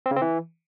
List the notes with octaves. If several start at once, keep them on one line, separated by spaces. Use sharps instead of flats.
C4
C#3
C4
E3